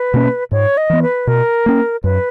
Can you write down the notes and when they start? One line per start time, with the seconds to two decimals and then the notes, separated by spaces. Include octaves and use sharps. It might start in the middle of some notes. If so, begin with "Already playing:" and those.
Already playing: B4
0.14 B2 A#3 C#4
0.52 G#2 C#5
0.77 D#5
0.90 E3 B3
1.02 B4
1.27 B2 A#4
1.66 A#3 C#4
2.04 F#2 B4